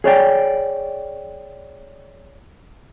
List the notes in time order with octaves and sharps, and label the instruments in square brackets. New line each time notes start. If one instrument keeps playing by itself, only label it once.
[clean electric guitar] G#4 C#5 D5 G5